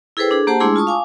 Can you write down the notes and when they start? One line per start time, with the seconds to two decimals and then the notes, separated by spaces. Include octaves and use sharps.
0.17 E4 G#4 A4 B4 C5 G5
0.31 D4 G#4 A4
0.47 A#3 G4 C5 F#5 A5
0.60 G#3 A3 D4 E4 G#4 C6
0.76 F4 A5 C#6 D#6
0.87 F5 G#5 D6